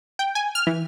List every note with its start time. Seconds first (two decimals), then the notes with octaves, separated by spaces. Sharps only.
0.19 G5
0.35 G#5
0.55 F6
0.67 E3